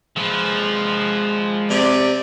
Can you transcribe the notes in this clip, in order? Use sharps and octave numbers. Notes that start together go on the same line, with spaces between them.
F3 G#3 B4
C3 D5